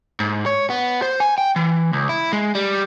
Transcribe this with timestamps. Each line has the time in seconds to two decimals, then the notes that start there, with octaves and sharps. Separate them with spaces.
0.20 G#2
0.46 C#5
0.70 B3
1.02 C5
1.20 G#5
1.38 G5
1.56 E3
1.93 C#2
2.09 E4
2.33 G#3
2.55 G3